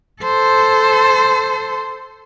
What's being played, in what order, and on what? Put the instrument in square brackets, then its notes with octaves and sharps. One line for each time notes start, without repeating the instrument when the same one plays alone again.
[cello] A4 C5